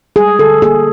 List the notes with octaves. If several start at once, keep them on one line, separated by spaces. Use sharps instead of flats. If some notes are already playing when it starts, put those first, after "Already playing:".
G3 G#4
D3 A4
A#3 G#4